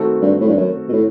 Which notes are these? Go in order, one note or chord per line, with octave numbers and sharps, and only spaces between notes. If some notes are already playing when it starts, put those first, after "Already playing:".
Already playing: D#3 A3 C4 F#4 A4
G2
A2
G2
F#2
B2
A2